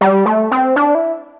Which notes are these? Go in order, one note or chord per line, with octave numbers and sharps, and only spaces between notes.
G3
A3
C4
D4
E4